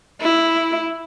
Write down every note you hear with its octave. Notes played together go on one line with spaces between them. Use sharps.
E4